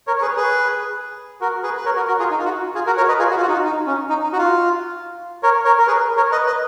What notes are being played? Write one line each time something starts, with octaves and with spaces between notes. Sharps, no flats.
A#4 C#5
C#5
G#4 B4
G#4 B4
F#4 A#4
G#4 B4
B4
A#4 C#5
F#4 A#4
F#4 A#4
F4 G#4
D#4
F4
F#4
F4 G#4
F#4 A#4
A#4 C#5
B4 D#5
F4 G#4
F#4
F4
F#4
D#4
F4
D#4
C#4
D#4
D#4
F#4
F4
A#4 C#5
A#4 C#5
A#4
G#4 B4
A#4 C#5
B4 D#5
B4 D#5